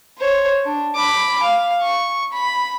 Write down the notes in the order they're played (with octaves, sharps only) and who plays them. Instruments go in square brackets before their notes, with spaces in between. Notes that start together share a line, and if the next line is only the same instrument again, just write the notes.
[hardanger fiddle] C5 C#5
D4
B5 D6
F5
C#6
B5